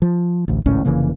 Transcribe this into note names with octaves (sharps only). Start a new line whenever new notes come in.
F3
A1 D2
G#1 C#2 A2 C#4
F1 C#3 E3 A#3